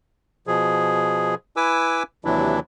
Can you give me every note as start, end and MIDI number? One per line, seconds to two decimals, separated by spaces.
0.47 1.35 47
0.47 1.35 53
0.47 1.35 68
1.56 2.03 64
1.56 2.03 71
1.56 2.03 80
1.56 2.03 86
1.56 2.03 88
2.25 2.60 39
2.25 2.60 48
2.25 2.60 52
2.25 2.60 54
2.25 2.60 62
2.25 2.60 64